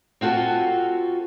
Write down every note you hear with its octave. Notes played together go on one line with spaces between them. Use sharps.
C4 F4 F#4 A4 G#5